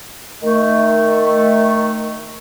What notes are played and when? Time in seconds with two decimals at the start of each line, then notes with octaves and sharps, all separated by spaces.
0.42 D#3 A3